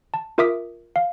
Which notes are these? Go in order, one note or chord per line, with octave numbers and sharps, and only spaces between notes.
A5
F4 A#4 E5 D6 D#6 B6
F5